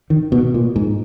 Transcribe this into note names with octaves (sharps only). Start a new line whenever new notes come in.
D#3
B2
A#2
G#2